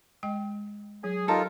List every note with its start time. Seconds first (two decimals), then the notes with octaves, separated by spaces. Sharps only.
0.23 G#3 D#5 G5
1.04 F#3 G#4
1.28 D#2 D#4 F4 A4 A#4